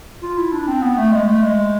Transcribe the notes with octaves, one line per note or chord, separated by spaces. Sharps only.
F4
E4
D4
C4
B3
A3
G#3
A3
G#3